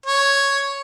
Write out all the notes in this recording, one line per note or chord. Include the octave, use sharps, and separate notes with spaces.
C#5